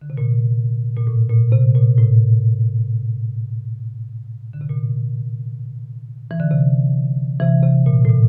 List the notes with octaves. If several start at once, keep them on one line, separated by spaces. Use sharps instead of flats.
D3
C3
A#2
A#2
A2
A#2
C3
A#2
A2
D3
C3
A#2
E3
D3
C3
C3 E3
C3
A#2
A2
A#2